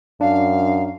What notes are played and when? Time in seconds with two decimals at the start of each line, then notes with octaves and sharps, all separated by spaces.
0.21 F#2 D4 F5